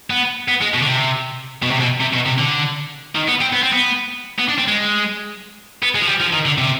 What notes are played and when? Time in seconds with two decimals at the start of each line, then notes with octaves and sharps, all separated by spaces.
0.10 B3
0.48 B3
0.61 G#3
0.74 B2
0.82 D3
0.86 C3
1.62 B2
1.71 C3
1.80 B2
2.01 C3
2.14 B2
2.26 C3
2.39 D3
3.15 D#3
3.28 B3
3.41 C4
3.53 B3
3.63 C4
3.73 B3
4.39 B3
4.48 D4
4.58 C4
4.68 G#3
5.83 B3
5.95 G#3
6.01 F3
6.07 G3
6.20 F3
6.33 D#3
6.45 D3
6.58 C3